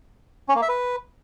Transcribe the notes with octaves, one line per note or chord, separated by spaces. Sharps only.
C#4
A#3
E5
B4